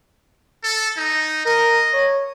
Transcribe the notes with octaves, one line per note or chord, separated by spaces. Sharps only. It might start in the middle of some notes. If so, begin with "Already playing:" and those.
A4
D#4
A#4 D#5
C#5